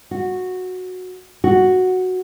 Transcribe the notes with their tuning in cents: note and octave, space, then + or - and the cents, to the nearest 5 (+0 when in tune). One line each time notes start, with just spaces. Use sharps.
F#4 -10
F#4 +0